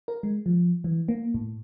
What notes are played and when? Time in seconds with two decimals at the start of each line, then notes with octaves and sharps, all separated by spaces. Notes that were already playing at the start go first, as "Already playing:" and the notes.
0.08 A#4
0.23 G#3
0.46 F3
0.84 E3
1.08 A#3
1.34 A2